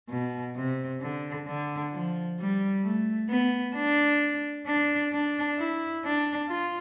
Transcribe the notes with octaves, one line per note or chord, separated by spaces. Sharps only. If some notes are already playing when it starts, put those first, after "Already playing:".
B2
C3
D3
D3
F3
G3
A3
B3
D4
D4
D4
E4
D4
F4